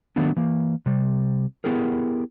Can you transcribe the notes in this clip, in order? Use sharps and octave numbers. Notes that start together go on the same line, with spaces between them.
D#3 F#3 A3 B3 D4
E3 A#3
C3 G3
B3 E4 G4 G#4 A#4